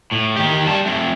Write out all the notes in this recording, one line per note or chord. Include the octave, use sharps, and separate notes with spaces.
A2
D#3 G4
G3 A5
A3 C4